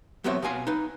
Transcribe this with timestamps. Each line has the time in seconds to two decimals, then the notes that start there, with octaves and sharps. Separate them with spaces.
0.24 F#3 A3 B3 C4 C#5 E5
0.42 B2 F5 G#5 C6
0.67 D#4 B4